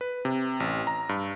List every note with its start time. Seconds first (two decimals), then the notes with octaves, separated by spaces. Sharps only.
0.01 B4
0.25 C3
0.60 A1
0.87 A#5
1.09 G2